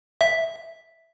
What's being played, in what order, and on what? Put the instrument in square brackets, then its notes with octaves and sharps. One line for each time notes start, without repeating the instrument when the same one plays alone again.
[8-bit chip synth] E5